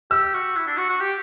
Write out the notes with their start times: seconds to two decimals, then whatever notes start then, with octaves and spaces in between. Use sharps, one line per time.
0.11 G4 E6
0.34 F#4
0.56 E4
0.67 D4
0.78 F#4
0.90 F#4
1.00 G4